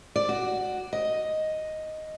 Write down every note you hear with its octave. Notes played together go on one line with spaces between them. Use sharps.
D5
F#4
D#5